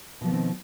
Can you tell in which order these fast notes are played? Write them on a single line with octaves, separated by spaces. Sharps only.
B2 F3 B3 D#3 C4